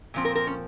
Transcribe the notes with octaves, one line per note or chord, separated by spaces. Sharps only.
A#2 F3 C4
A#4
A#4
C#4